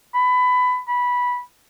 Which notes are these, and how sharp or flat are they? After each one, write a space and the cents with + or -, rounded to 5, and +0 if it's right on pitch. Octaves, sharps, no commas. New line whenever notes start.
B5 +20
B5 -10